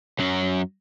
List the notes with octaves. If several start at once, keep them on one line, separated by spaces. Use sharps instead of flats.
F#2 F#3